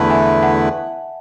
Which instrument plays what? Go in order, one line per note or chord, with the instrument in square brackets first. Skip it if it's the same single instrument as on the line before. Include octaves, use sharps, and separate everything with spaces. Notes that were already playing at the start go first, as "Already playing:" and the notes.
Already playing: [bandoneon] E2 D3 A3 E4 B4 [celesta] F#5 A5
[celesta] E5 G#5
F#5 A5